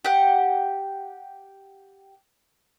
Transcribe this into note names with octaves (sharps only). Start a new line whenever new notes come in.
G4 F#5